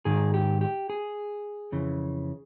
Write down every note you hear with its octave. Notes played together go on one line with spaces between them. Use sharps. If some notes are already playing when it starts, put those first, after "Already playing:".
G#2 D#3 G#4
G4
G4
G#4
F2 C#3 E3